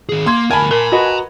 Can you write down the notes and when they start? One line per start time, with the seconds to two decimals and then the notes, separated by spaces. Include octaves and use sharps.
0.09 D#3 G#4
0.26 A#3 C6 G#6
0.51 D2 A#4 G#5 A5 B5
0.71 A#4 A#5 C6
0.92 F#4 B4 D#5